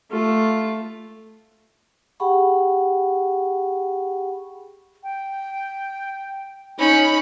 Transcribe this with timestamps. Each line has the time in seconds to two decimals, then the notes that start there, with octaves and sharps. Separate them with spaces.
0.11 A3 F4
2.20 G4 G#4 F#5 G5 B5 C#6
5.03 G5
6.78 C#4 D#4 D#5 B5